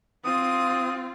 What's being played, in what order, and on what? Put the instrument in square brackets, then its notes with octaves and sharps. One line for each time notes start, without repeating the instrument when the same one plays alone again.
[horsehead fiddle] C4 F4 [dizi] D#6